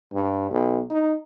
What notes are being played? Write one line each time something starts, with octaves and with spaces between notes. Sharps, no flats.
G2
B1
D#4